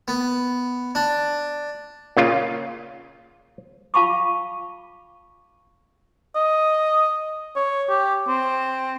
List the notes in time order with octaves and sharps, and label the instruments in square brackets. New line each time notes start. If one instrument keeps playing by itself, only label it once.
[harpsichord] B3
D4
[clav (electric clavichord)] A#2 C#3 F4
[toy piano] F4 F5 A5 B5 C#6 D6
[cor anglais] D#5
C#5
G4
C4